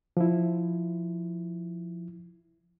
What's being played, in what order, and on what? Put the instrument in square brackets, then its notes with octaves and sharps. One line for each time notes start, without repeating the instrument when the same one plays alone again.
[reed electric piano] F3 E4